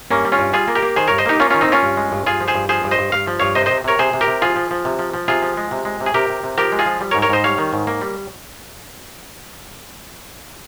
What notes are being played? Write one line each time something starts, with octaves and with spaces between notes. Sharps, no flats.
G2 A#3 C#4
G3
C#4 F4
G2
G3 F4 G#4
A#3
G4 A#4
A#3
D#3 G#4 C5
G2 A#4 C#5
C5 D#5
A#3 D#4 G4
A#3 C#4 F4
D#3 C#4 F4
C4 D#4
A#3 C#4 F4
G2
G#3
G2
G2 F4 G#4
F3
G#4 C5
G2
F3 G#4 C5
G2
C5 D#5
G2
G2 F5
F3
G2 C#5 F5
C3 C5 D#5
C3 C5 D#5
C3 A#4 C#5
C3 G#4 C5
C3
G4 A#4
C3
F3 F4 G#4
F3
F3
C3
F3
F3
C3 F4 G#4
F3
G#3
C3
G#3
C3
G#4
C3 G4 A#4
C3
C3
F3 G4 A#4
G#3
F4 G#4
F3
G3
A#4 C#5
G#2
A#4 C#5
G#2 C5 D#5
G3 C#5 F5
D#3
G#2
A#3
G3